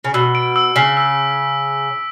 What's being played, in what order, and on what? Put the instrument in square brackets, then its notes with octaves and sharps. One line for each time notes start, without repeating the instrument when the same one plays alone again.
[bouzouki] C#3
[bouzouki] B2 [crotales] E6
[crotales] D7
E6
[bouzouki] C#3 [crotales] B6
[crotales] E6